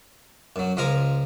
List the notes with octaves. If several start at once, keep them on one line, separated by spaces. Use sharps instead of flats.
F#2 F#3
C#2 F3 A#4 F5 G#5 A#5